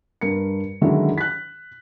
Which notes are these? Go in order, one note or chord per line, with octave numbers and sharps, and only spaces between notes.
G2 A#4 C#7
D3 D#3 F#3 G#3 C#4 E4
F#6 B6